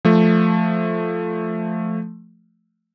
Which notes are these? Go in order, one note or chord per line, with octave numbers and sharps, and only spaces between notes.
F3 A3